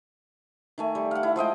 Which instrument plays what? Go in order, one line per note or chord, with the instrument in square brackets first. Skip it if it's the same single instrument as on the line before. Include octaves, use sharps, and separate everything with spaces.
[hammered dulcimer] D#3 A3 G#5
G3
F5 F#5
E4
F3 G#3 D#5 G5